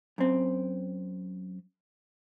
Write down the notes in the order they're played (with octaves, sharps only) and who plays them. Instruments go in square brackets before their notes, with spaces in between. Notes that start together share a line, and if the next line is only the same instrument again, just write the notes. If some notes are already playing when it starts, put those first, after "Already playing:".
[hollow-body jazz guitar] F#2 C4